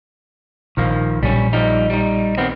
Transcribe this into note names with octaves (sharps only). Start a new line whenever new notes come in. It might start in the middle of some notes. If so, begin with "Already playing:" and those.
A#1 D#3 F3 A#3
A#1 G3 C#4
F3 G3 D#4
G3 D#4
D#3 B3 C4